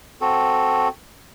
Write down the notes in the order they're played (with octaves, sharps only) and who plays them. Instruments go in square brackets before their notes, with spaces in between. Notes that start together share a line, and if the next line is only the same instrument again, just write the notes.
[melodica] C4 F#4 A4